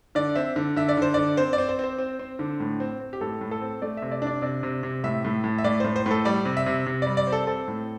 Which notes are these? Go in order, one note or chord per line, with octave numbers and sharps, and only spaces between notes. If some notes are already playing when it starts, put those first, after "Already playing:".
D3 D5
C4 E5
D3
D3 E5
D5
D3 C5
D3 D5
C4 C5
D5
C4
C5
C4 C5
C4
C4
D3
A2
C4
C4
G4
A2 A4
A2
A4
C4
A3 D5
C3 E5
D5
D4 D5
C3 D5
C3
C3
A2 E5
A2
A2
E5
A2 D5
A2 C5
C5
A2 A4
G3 D5
C3
E5
C3
C3
G3 D5
D5
C4
A4
C4 A4
A2